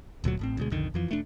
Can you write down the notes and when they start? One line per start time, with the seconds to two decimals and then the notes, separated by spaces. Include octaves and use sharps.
0.24 D1 D2 A#2 F#3
0.39 A1 A2 C4
0.57 D2 B2 G#3
0.71 B1 F2 D3 D#3
0.94 F2 E3 F3
1.08 E1 A3 D4